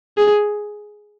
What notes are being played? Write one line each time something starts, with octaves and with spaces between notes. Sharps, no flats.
G#4